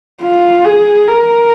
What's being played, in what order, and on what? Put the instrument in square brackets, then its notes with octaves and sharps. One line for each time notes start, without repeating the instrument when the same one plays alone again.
[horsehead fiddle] F4
G#4
A#4